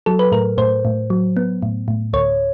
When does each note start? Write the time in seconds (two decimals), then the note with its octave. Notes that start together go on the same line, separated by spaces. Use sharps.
0.06 F#3 A4
0.19 B4
0.32 A2 A#4
0.58 A2 C5
0.85 A2
1.10 F#3
1.37 B3
1.63 A2
1.88 A2
2.13 D2 C#5